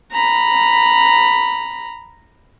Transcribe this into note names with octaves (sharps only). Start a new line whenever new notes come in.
A#5 B5